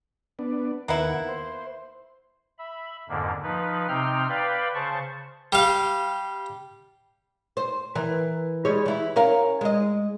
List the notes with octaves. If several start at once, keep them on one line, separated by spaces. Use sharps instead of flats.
B3 D4
D#2 A#3 B3 E4 F#5
C5
E5 B5
F2 G#2 D3 A#3
F3 D#4 B4
C3 C4 D#4 G5 F6
B4 D5 F5 G5 B5
C#3 C5 A5 C#6
G3 F5
C5
E3 A#4
G3 G#3 C#5
E3 E4
C#4 A#4 F5
G#3 D#5